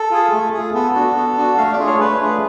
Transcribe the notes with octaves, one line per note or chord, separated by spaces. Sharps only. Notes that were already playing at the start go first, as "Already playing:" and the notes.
Already playing: A4
F4 G#4
A3
F4 G#4
B3 A4
D4 F#4
B3
D4 F#4
A3 F5
D5
D4 F4 G#4
C#5
A3 B4
D4 F4 G#4